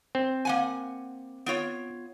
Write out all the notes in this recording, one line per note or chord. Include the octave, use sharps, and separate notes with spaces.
C4
A#3 F#5 G#5
B3 F4 C#5